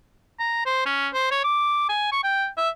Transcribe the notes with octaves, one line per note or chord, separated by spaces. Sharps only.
A#5
C5
C#4
C5
C#5
D6
G#5
C#6
G5
E5